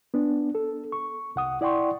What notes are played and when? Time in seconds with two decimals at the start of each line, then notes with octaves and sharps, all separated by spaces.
0.14 B3 D4
0.55 A4
0.92 C#6
1.36 C2 F#5 D#6
1.61 E4 D5 F#5 G5 C6 C#6